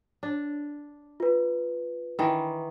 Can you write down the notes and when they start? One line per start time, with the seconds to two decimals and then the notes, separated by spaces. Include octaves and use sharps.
0.23 D4
1.20 F4 B4
2.19 D#3 E3